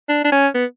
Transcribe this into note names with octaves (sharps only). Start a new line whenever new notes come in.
D4
D4
C#4
B3